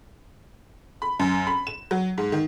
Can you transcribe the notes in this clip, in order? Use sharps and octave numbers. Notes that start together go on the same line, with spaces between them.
B5
F#2
B5
E7
F#3
G#2
D#3